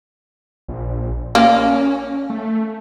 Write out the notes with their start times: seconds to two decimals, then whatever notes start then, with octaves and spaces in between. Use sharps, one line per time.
0.68 A#1
1.35 A#3 C#4
2.30 A3